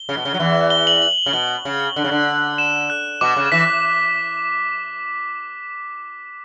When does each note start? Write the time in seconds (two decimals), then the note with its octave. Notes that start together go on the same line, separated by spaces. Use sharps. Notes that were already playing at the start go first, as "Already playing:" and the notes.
Already playing: G7
0.09 C#3
0.17 B2
0.25 C#3
0.34 F#3
0.39 E2 E3
0.70 G7
0.87 F#7
1.02 F#7
1.26 C#3
1.33 B2 G7
1.65 C#3
1.96 D3
2.04 C#3
2.11 D3
2.58 E7
2.90 F#6
3.21 B2 D6
3.37 C#3
3.52 E3 B6